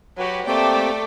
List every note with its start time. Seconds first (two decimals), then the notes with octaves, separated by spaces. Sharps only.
0.17 F#3 F#4 G4 B4
0.47 A3 A#3 C4 G4 D5 G5 D6